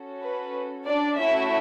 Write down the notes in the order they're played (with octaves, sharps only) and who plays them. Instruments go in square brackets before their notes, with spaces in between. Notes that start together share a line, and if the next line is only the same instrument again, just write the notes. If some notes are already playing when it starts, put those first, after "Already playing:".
Already playing: [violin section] C#4 F#4 A4
B4
D4 D5
A3 C#4 E4 F#4 E5